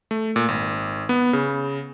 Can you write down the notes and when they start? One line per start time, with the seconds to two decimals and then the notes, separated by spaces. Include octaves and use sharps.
0.11 A3
0.36 A#2
0.48 G#1
1.09 B3
1.33 C#3